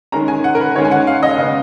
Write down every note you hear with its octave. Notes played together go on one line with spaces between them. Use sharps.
D#3 G#3 C#4 A#5
G#5
F#5
A#4
B4
D#3 G#3 C#4 C#5
G#5
F#5
F5
D#5
C#3 G#3 B3 F5